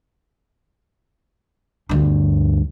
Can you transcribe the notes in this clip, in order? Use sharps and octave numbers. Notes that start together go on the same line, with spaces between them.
D2 G2